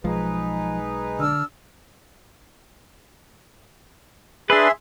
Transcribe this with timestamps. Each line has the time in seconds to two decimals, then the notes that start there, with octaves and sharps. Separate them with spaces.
0.04 B1 F3 G#3 D#4 G#4 B4
1.19 D3 D4 E6 F6
4.50 D4 G#4 B4 E5 C6